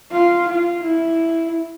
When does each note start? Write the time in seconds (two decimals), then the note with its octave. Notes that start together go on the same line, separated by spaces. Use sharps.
0.12 F4
0.48 F4
0.84 E4